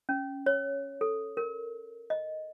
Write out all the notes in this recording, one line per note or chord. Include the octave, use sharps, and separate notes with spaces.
C#4
C#5
A4
A#4
D#5